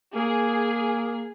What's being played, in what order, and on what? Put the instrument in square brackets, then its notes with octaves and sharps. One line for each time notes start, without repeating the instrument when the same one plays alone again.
[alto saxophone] A#3 [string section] G#4